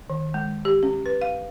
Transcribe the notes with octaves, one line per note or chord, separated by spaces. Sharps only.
D#3
G#3
G4
C#4
B4
F5